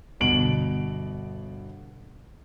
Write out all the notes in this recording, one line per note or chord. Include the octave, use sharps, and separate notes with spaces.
G1 B2 D7 F#7